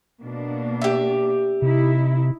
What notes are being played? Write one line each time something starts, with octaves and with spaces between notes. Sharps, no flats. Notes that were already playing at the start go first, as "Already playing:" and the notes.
B2 A#3 D4
G4 E5
C3 D#4 E4